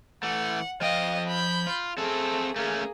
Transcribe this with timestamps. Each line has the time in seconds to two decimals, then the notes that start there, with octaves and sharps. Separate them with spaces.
0.23 E3 A3 F#5
0.81 F3 D#5 F5 G5
1.27 B5 G6
1.67 F4
1.98 A3 C4 G#4 A4
2.56 A3 A#3 C#4 G#4